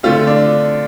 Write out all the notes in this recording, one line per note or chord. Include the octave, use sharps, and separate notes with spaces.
D3 A3 C4 F4
D4